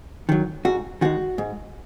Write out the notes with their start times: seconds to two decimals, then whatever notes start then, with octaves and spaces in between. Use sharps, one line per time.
0.29 D#3 F#3
0.65 G#2 F#4
1.01 D#3 G#3 F#4
1.38 G#2